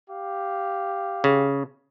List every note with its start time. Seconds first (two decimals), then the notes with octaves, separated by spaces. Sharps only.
0.10 G4 F5
1.24 C#3